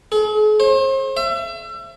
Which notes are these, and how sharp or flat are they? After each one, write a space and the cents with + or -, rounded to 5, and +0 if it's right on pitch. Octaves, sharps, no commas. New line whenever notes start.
G#4 +45
C5 +40
E5 +35